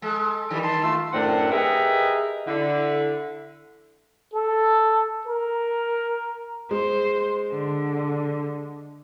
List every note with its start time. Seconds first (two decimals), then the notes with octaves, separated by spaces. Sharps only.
0.02 G#3 A4
0.51 D#3 E3 G3
0.63 D#3 A5 C6
0.83 A3 F4 E6
1.13 F#2 A2 C4 D4 A#4 F#5
1.51 G4 G#4 A#4 B4 D#5 E5
2.47 D3 E4
4.33 A4
5.26 A#4
6.71 G#3 C5
7.51 D3